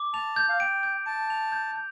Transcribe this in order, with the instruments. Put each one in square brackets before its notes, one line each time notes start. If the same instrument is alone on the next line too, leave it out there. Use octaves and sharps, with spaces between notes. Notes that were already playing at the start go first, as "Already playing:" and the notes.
Already playing: [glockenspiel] D6
[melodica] A5 [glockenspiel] F7
[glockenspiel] G6
[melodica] F5
[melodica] G5 [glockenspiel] D7
[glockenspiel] G6
[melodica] A5 [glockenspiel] D7
[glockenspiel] F7
G6
G6